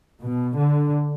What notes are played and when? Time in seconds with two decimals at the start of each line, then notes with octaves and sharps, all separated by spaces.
0.20 B2
0.57 D3